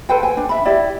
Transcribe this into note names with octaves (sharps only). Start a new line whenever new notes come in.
A4 B4 C5 G5
G5 G#5
D4
E5 B5
E4 G4 D5